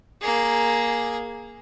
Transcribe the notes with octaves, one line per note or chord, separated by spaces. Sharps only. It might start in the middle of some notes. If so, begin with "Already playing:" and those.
A#3 G#4